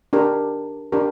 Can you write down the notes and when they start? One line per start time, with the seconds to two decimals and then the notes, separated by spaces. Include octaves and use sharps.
0.13 D4 G4 A#4
0.92 D4 G4 A#4